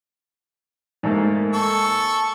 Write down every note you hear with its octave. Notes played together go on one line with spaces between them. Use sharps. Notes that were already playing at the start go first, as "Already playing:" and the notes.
G#2 A3 A#3
A4 C#6 E6